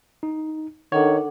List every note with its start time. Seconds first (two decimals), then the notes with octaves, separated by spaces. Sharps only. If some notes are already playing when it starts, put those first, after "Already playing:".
0.23 D#4
0.92 D#3 D4 A4 C#5 F#5